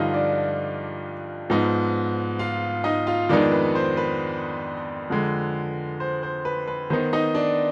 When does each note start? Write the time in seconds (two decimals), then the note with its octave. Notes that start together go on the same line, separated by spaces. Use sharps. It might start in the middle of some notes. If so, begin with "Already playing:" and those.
Already playing: G2 D3 F3 D#4 F4 D#5 F5
0.14 D4 D5
1.50 G#2 F3 B3 D#4
2.39 F4 F5
2.84 D#4 D#5
3.07 F4 F5
3.29 F2 D#3 G#3 B3 D4 D#4 D5
3.51 B4
3.75 C5
3.97 B4
5.10 F2 D3 G#3
6.00 C5
6.23 C5
6.45 B4
6.68 B4
6.90 D#3 B3 D#4 C5
7.13 D#4 D#5
7.35 D4 D5